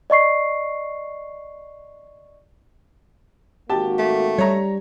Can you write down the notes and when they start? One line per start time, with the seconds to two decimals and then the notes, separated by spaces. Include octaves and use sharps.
0.10 D5 D#5 C#6 C7
3.70 G#1 A#3 F#4 G4 A5
3.98 A3
4.38 G3 C#5 A#5